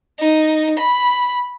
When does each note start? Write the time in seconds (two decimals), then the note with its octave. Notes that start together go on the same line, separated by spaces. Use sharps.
0.19 D#4
0.79 B5